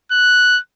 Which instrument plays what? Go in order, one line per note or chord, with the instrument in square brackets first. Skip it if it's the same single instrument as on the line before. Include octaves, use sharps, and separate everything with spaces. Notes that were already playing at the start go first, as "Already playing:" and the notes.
[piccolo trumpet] F#6